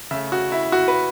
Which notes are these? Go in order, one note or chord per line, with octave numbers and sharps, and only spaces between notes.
C#3 A3 E5
F#4
E4
F#4
B4